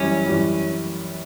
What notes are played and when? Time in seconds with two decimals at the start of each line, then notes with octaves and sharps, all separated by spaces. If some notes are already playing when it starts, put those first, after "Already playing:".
Already playing: F#2 E3 G3 C#4
0.26 F#2 E3 G3